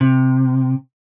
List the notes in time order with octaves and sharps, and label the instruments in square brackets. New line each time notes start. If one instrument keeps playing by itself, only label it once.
[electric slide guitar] C3